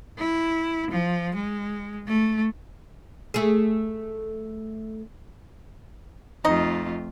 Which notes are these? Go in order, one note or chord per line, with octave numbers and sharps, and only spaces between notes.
E4
F3
G#3
A3
A3 G#4
F2 A3 D#4 F4 D#5